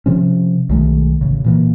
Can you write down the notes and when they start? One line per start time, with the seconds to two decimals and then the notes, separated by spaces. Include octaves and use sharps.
0.06 C3 F3 C#4
0.69 B1 D#3 G#3 A3
1.21 A1 C#3
1.44 A#2 E3 A#3